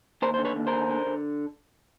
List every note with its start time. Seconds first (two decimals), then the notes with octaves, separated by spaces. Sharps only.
0.22 D#2 A#4 C5
0.34 D3 C5
0.45 B4 C#5
0.56 D#2
0.67 A#4 C5
0.73 D3
0.90 D3
1.06 D3